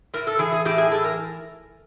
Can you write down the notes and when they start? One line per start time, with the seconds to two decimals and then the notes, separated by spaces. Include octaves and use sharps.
0.14 A2 A#4
0.27 A4
0.39 E3 G#4
0.52 G#4
0.65 A2 G4
0.78 G#4
0.91 E3 A4
1.04 A#4